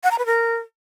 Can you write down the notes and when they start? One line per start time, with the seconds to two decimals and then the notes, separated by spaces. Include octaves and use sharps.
0.04 F#5
0.11 A#5
0.19 B4
0.26 A#4